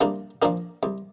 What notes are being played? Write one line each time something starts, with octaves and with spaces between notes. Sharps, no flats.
C2 A#3 D4
A#2 F3 A#3 D4
C2